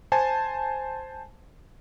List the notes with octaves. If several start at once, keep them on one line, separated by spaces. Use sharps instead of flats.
C5 G#5 A5